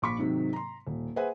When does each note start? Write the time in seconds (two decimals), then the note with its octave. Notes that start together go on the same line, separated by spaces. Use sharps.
0.02 A#1 B5 C#6 D6 B6
0.18 G#2 C3 D#3 F#3
0.53 A#5 C6
0.87 D#1
1.16 G#4 B4 C5 E5 F#5 G#5